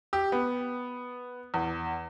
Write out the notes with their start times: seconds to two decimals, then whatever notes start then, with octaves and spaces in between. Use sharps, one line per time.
0.13 G4
0.32 B3
1.54 E2